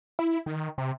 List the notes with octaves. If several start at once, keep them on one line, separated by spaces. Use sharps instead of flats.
E4
D#3
C3